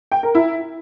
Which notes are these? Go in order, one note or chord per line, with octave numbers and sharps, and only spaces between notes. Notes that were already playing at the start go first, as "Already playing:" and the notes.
G5
A#4
E4